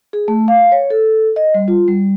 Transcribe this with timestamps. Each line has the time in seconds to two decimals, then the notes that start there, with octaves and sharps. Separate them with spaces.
0.13 G#4
0.28 A3
0.48 F5
0.72 C#5
0.90 A4
1.36 D#5
1.54 G3
1.68 F4
1.88 G3